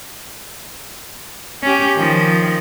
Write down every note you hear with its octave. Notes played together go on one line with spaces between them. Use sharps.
C#4 G4
D#3 F3